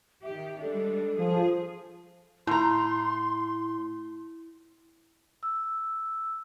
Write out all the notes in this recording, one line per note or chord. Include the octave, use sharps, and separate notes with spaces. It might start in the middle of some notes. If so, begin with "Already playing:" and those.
D#3 G4 E5
G3 G#3 D4 A4
F3 G#4
A2 E4 A#5 C6
E6